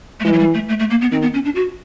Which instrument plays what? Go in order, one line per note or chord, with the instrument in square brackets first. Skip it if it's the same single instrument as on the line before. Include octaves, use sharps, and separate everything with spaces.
[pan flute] A3
[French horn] E3 [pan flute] G#3
[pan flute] F#3
G3
A3
A3
A3
A#3
B3
[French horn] D#3 [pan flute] C4
[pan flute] B3
C#4
D4
F#4